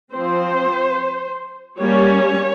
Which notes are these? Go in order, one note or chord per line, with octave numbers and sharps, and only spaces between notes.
F3 C4 C5
G3 A#3 C#4 C#5